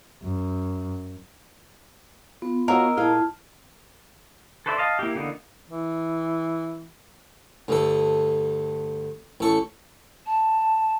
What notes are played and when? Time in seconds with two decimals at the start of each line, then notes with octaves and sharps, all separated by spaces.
0.22 F#2
2.42 B3 F4
2.68 F#4 A#4 C#5 D#5 F5 A#5 E6
2.97 A#2 E4 G#4 F5 A5 F6
4.66 A4 B4 C5 D5 E5
4.78 D#5 F5 A5
4.99 A#3 E4 G4
5.15 D3 E3 A#3 B3 D#4
5.69 E3
7.68 D2 G2 A4
9.40 A1 A4 C#6
10.26 A5